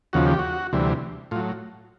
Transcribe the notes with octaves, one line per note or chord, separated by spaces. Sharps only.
D#2 C#3 F3 F#4
G4
F#4
D2 C3 E3 G3
A2 F#3 F4